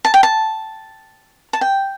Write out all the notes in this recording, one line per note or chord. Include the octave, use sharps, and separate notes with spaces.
A5
G5
A5
A5
G5